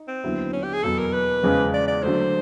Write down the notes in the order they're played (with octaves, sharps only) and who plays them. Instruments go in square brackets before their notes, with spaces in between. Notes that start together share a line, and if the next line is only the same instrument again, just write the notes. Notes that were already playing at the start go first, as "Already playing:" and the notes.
Already playing: [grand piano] D#4
[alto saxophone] C4
[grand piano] D#2 D3 F#3 B3 E4
[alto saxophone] C#4
G4
G#4
[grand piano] E2 B2 F#3 B3 [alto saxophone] A4
[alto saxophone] A#4
B4
[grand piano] E2 C#3 F3 G#3 C#4
[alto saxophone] D5
D5
[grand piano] D3 F#3 A3 [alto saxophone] C5